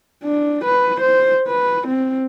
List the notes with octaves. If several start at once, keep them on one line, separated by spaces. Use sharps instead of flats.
D4
B4
C5
B4
C4